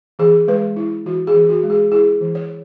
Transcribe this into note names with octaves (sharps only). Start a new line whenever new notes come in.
E3 G#4
G#3 B4
E4
E3 F#4
G#4
E3
F#4
G#3
G#4
E4 G#4
E3
C#5